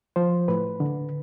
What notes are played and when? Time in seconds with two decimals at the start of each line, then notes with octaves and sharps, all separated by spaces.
0.16 F3 C5
0.48 A2 B4
0.80 D3